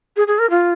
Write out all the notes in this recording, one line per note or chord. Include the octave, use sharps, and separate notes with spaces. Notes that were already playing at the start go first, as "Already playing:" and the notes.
G#4
G#4
A#4
F4